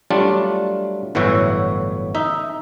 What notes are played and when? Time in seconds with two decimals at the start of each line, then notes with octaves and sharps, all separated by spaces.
0.10 F#3 G3 A3 D4 F4
1.15 G1 A2 E3 F#3 F#4 E5
2.15 D#4 E5